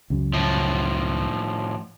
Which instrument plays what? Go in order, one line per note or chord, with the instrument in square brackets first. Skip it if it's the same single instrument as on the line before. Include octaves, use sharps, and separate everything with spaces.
[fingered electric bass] C#2 F#2
[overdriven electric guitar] A2 F3